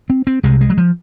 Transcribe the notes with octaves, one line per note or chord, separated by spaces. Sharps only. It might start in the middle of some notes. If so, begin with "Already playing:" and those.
C4
C4
C2 C3 G#3
G#3
F#3
F3